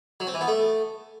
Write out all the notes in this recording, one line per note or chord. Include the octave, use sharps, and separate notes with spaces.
F#3
C4
E3
B3
A3